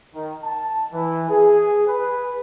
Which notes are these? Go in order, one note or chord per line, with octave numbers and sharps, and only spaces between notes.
D#3
A5
E3
G#4
B4